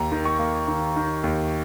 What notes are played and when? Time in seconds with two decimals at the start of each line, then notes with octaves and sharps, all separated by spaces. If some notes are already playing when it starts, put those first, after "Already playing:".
Already playing: D#2 A#5
0.12 D#3
0.25 C#6
0.39 A#3
0.68 D#3
0.96 D#3
1.24 D#2